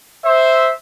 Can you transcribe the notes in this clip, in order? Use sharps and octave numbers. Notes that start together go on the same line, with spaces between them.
C5 E5